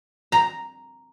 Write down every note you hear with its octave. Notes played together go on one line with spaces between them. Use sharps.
A#5